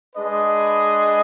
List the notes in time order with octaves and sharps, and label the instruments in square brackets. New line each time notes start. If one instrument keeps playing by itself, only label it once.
[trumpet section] G#3 D4 G#4 B4 D#5